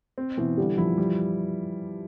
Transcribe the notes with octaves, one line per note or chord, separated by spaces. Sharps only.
C4
B2 E3
D3 G3
F3 E4
G3